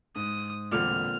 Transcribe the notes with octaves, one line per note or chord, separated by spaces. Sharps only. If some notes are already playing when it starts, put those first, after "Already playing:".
G#2 D#6
E1 A#2 D3 C4 D6 F6